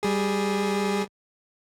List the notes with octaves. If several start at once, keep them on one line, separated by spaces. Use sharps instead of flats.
G3 G#4